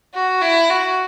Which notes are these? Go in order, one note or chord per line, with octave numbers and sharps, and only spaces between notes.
F#4
E4
F#4